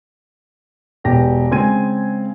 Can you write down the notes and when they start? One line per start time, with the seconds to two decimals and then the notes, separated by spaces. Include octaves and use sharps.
1.04 E1 B2 G4 A#6
1.51 C#3 G#3 C4 G#5 G#6 D#7